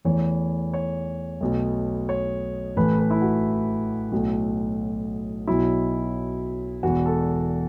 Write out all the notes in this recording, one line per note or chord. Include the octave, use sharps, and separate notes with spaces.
E2 E3 A3 C#5
C#5
B1 B2 A3
C#5
A1 A2 E3 A3 B4
B4
E4
F#4
B1 A2 A3 F#4
B1 B2 F#3 E4
E1 E2 E3 F#4
A4